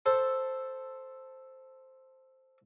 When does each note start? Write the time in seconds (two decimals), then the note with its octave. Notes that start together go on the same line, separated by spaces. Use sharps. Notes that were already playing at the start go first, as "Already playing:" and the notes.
0.06 A4 C5